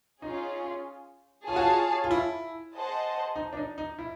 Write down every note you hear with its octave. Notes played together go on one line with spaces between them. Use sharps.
C#4 D#4 F4 G#4
F4 G#4 C#5 F5 A5
F#4
F4
F4
E4
G#4 C5 D#5 F#5 A5
D#4
D4
D#4
D#4
E4